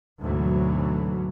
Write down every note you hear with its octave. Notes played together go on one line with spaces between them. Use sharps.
D2 G#2 B2 E3 F#3